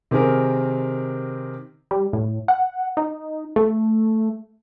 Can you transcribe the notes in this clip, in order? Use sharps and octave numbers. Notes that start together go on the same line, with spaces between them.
C3 D#3 C4 G#4 A#4
G3
A2
F#5
D#4
A3